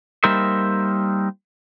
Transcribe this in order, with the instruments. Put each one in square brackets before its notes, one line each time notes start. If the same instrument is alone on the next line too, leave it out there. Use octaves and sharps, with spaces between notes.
[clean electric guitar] G3 A#3 D#4 A#4 C5 E5